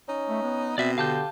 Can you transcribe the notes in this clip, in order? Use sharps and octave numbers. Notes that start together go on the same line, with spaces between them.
C#4 D#4
A3
B3
B2 C4 D5 E5
D3 G4 F5 A5 G6